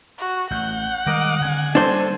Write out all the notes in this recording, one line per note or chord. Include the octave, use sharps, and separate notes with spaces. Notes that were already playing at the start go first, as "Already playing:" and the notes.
F#4
A1 F#5 G6
D#3 G3 G#3 A#4 D#5 D6
D3 C4 G#5
G3 A#3 D4 A4 C5